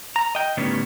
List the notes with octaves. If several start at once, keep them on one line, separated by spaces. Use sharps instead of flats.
A#5
D#5 G5
A2 D3 D#3 G3 B3 C#4